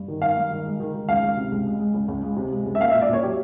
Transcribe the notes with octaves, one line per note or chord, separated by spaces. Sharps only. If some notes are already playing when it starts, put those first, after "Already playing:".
Already playing: G2
D#3
D#3 F5
G2
D#3
G#3
D#3
D#3
C#2 F5
C#2
C3
C#2
G#3
G#3
C#2
C#2
G#3
C3
G#3
C#2
E5
A#3 F5
E5
A#2
D5
A#2 C#5
F#3 G4